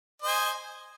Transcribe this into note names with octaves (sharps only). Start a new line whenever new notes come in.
C5 D#5 G#5